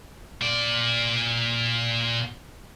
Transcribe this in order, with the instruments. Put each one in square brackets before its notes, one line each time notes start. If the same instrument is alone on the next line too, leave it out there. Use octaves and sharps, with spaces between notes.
[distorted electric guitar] A#2 D5